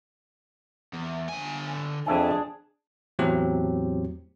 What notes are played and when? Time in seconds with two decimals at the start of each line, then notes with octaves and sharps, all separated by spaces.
0.93 E2
1.29 D3 G#5
2.06 F2 D4 G#4 E5 G#5
3.19 E2 A2 F#3 C4 G4